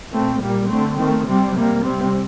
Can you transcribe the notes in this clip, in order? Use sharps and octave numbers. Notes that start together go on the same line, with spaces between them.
A#2 A3 C4
A#2 G3 A#3
D3 A3 C4
D#3 A3 C4
C3 G3 C4
C3 G3 A#3
C3 G3 C4